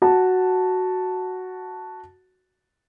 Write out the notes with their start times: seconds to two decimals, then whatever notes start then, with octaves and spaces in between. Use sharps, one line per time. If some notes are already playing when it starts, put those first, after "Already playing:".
0.02 F#4 A5